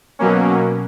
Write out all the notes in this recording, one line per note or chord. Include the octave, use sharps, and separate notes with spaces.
B2 F#3 A#3 C#4